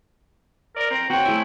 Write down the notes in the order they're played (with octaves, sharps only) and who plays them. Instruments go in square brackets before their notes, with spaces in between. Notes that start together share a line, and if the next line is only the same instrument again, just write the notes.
[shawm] A#4 [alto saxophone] D5
[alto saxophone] C4 [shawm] A#5
[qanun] C4 C#5 [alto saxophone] F#4 [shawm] G5
[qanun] A3 G#5 [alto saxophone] E4